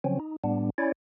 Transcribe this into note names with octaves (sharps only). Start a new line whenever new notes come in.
C#3 F3 F#3 C4 C#4
D#4
A2 G3 B3 D4
C#4 E4 C#5 D5